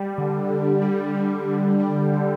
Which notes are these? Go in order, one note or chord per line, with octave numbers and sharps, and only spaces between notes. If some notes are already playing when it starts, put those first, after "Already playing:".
Already playing: G3
D3
D3
G3
G3
D3
G3
D3